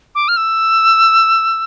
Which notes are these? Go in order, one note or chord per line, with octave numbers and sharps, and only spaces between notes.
D6
F6
E6